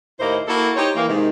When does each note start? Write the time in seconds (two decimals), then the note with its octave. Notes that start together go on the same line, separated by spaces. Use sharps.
0.20 D#2 A2 A#3 D#4 E4 C5
0.47 A#3 E4 F#4 A4
0.76 D#4 G4 C5 C#5
0.96 E3 A#3
1.08 G#2 C3 D#3